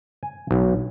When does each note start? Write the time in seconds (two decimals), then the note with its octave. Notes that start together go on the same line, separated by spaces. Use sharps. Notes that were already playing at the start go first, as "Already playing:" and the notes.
0.23 G#5
0.51 B1